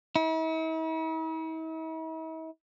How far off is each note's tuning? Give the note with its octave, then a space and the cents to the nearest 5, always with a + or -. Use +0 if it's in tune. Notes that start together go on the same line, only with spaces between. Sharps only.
E4 -45